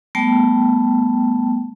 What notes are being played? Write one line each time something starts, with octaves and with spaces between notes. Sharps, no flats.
G3 A3 B3 G5 A5